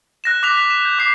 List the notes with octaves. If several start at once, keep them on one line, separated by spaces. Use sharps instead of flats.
F#6 A#6 E7
D6 F#6 B6 F7
B6
E7
G6
D6 C7